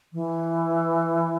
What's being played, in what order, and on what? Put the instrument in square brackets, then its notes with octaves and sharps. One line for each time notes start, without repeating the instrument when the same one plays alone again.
[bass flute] E3